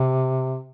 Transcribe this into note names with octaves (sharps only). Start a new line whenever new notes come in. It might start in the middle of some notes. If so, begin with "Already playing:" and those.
Already playing: C3